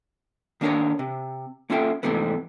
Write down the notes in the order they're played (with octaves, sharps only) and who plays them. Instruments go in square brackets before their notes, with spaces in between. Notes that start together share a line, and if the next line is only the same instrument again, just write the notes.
[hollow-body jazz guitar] D#3 A#3 D4 A#4 C#5 D#5
C3
A#3 C#4 F4 A4 E5 G5
F2 G#2 C3 E3 A3 B3